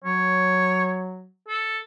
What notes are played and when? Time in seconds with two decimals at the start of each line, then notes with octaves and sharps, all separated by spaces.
0.04 F#3 C#5
1.48 A4